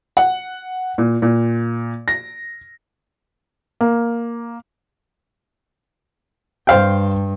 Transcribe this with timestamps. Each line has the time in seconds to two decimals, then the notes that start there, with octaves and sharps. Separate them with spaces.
0.17 F#5
0.98 A#2
1.22 A#2
2.08 A#6
3.81 A#3
6.67 G2 C5 F5 G5